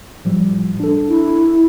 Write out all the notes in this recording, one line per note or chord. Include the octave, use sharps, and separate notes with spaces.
A2 F3 G3
D4 A4
E4